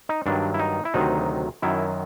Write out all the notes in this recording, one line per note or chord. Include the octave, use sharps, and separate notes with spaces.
D#4
G2 D#3 F#3 D4
E4
D#4
E4
D2 C3 D#3 F#3 D#4
F#2 D#3 F#3 E4